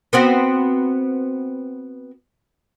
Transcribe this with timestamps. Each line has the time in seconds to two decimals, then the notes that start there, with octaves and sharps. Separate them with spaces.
0.13 B3 C4 F#4